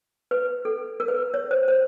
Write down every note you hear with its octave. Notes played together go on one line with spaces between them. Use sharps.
B4
A4
A#4
B4
C#5
C5
C5